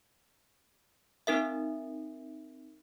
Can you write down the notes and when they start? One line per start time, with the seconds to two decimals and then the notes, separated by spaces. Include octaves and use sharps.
1.27 C4 D#4 A#4 E5